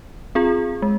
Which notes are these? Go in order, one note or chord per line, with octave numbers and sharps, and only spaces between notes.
C4 F4 G#4
G#3